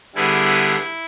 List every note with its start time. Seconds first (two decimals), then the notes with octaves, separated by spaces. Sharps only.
0.15 D3 G3 B3 E4 G#4
0.77 E4